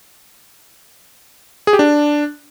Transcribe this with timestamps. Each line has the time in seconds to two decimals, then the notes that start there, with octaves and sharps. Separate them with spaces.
1.67 G#4
1.73 G4
1.79 D4